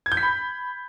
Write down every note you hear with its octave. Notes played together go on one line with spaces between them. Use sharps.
G#6
G6
B6
B5